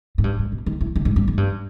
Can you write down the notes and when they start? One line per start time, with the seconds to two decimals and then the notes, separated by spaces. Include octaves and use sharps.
0.18 G#2
0.24 G2
0.39 G#2
0.52 B2
0.66 D#3
0.81 E3
0.96 D#3
1.05 G#2
1.16 G2
1.28 G#2
1.37 G2